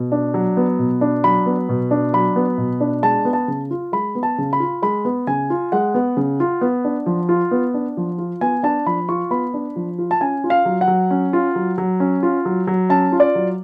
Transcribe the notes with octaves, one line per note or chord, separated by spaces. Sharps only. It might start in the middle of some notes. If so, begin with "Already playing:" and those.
Already playing: B2
D4
F#3
B3
B2
D4
F#3 B5
B3
B2
D4
F#3 B5
B3
B2
D4
G#3 A5
B3
A5
C#3
F4
G#3 B5
B3
A5
C#3
B5
F4
G#3 B5
B3
C#3 G#5
F4
G#3 F#5
B3
C#3
F4
B3
D4
F3
F4
B3
D4
F3
F4
B3 G#5
D4 A5
F3 B5
F4 C#6
B3 B5
D4
F3
F4
A5
C#4 G#5
F4
F5
F#3
F#5
F#3
C#4
F4
F#3
F#3
C#4
F4
F#3
F#3
C#4 A5
F4
D5
F#3